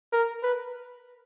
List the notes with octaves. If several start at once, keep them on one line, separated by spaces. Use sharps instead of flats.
A#4
B4